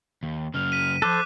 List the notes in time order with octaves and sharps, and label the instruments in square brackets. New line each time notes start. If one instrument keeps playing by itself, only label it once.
[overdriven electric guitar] D#2
[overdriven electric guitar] F#2 C#3 [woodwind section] F6
[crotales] B6 D#7
[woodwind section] F3 [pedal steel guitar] A4 C5 [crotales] D6 F#6